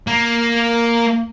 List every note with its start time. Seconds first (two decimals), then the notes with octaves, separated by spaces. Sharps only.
0.07 A#3